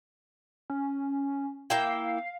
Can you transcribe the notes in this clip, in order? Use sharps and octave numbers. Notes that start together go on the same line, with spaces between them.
C#4
A#3 E4 F5 G5